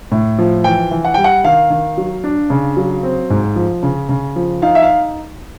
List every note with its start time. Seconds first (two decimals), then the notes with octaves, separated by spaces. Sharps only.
0.12 A2
0.38 F3
0.64 E3 G5
0.91 E3
1.05 F#5
1.14 G3 G5
1.24 F#5
1.44 D#3 F5
1.70 D#3
1.98 F#3
2.24 D4
2.50 C#3
2.77 F#3
3.03 C4
3.30 G#2
3.56 F3
3.83 C#3
4.09 C#3
4.36 F3
4.62 D#4 F5
4.75 E5
4.82 F5